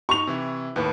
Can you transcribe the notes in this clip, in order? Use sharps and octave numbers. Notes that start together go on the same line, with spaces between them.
D#4 C#6 F7
C3 E3 E4
D#2 A2 B4